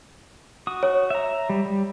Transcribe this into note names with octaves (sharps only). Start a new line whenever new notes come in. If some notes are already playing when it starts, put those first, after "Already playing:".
F#4 D#6
C#5
E5 A#5
G3
G3